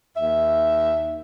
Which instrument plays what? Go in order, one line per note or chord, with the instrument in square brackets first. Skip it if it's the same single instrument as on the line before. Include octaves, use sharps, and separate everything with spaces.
[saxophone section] D#2 E5